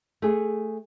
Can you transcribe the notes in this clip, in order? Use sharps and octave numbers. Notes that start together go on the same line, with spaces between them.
A3 G#4